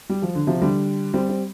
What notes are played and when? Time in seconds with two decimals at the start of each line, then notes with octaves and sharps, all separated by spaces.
0.09 G3
0.22 F3
0.35 D3
0.47 C3 F3
0.61 D3 G3
1.14 G3 C4
1.29 C4